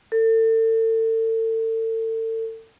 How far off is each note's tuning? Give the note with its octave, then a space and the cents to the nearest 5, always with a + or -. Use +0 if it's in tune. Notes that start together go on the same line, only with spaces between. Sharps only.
A4 +35